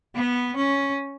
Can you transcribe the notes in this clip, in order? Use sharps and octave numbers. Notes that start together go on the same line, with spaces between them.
B3
C#4